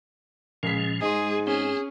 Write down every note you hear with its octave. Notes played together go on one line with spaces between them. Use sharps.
C#2 A#2 F3 G#3 C#4 B6
G#2 G#3 G#4 D#5 C6
C4 C#4 G#4